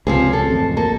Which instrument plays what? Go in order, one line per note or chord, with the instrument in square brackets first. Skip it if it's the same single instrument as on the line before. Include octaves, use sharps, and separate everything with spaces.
[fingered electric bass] C#2 C3 [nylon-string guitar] F3 C4 G#4
[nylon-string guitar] A4
[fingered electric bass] A1 F2
[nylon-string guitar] A#3 A4